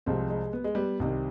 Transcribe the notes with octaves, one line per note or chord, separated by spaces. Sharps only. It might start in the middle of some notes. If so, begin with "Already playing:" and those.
C2 C3 F3 G#3 C4
G#3
B3
G#3
G3 B3
C2 C3 D#3